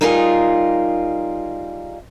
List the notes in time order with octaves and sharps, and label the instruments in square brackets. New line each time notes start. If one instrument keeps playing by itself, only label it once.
[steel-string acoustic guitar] G3 D#4 F4 G#4 A#4